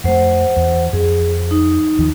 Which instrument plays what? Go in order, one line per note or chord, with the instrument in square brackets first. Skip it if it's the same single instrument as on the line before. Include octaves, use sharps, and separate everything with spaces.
[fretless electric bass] F2 A3 [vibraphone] C5 F#5
[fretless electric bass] E2
[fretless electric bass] F2 [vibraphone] G#4
[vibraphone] D#4
[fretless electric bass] D#2 D#3 F3